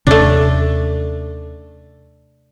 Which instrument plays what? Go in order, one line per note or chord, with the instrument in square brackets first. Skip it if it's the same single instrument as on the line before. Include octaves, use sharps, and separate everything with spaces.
[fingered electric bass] D#2 C3 C#4 [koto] A3 D4